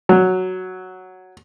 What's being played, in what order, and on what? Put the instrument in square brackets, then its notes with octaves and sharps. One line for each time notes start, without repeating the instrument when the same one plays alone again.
[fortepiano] F#3